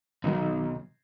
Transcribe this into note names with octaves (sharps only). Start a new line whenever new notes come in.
B1 B2 D#3 F#3